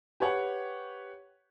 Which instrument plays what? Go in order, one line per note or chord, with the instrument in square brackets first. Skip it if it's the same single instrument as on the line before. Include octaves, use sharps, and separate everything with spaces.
[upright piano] G4 B4 C#5 F#5